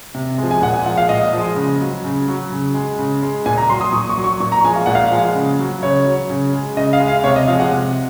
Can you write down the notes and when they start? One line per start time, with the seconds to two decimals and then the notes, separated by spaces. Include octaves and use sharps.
0.15 C3
0.38 F3 G#3
0.51 G#5
0.62 A#2 F#5
0.74 G#5
0.86 F3 G#3 F#5
0.97 F5
1.09 A#2 D#5
1.33 F3 G#3
1.56 C#3
1.81 F#3
2.04 C#3
2.28 F#3
2.52 C#3
2.74 G#3
2.99 C#3
3.23 G#3
3.46 A#2 G#5
3.58 A#5
3.69 F#3 C6
3.81 D#6
3.93 A#2 C#6
4.09 C#6
4.17 F#3
4.24 C#6
4.40 A#2 C#6
4.52 A#5
4.64 F3 G#3 G#5
4.76 F5
4.86 A#2 F#5
4.95 F5
5.11 F3 G#3
5.35 C#3
5.59 F#3
5.82 C#3 C#5
6.06 F#3
6.30 C#3
6.53 G#3
6.77 C#3 D#5
6.93 F5
7.00 G#3
7.08 F5
7.24 C3 C#5
7.36 D#5
7.48 F3 F5
7.51 G#3
7.60 F#5
7.72 C3